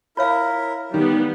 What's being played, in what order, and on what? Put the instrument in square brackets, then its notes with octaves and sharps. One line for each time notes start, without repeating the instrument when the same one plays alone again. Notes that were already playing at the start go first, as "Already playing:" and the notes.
[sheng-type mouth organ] E4 A#4 [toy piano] F4 C#5 F5
[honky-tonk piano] D#3 [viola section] G3 B3 [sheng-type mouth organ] G4